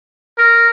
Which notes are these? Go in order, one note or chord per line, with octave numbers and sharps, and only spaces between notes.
A#4